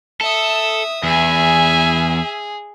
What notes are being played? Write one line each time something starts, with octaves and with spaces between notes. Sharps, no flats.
A4 E5 D#6
E2 G#4 E5 G#5